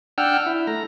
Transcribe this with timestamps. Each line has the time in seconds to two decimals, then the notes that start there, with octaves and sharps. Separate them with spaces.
0.18 D4 F#5 G5 E6 F6
0.47 E4
0.67 A3 A#5